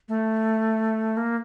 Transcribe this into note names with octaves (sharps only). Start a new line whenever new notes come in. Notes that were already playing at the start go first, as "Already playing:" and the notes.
A3
A#3